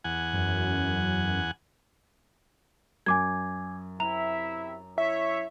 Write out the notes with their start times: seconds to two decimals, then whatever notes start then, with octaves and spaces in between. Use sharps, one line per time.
0.04 E2 F#5 G#5
0.34 F#2
3.06 F#2 G#5 D6 G#6
4.00 C3 E4 E5 A#5 F7
4.98 E4 C#5 E5